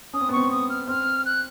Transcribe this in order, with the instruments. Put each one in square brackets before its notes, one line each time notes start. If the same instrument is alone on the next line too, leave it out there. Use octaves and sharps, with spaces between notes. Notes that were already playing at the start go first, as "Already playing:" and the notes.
[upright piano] C#4 [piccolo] D#6
[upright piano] C4
B3
[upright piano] C4 [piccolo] C#6
[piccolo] D#6
F6
[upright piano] C4 [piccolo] F6
[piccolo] F#6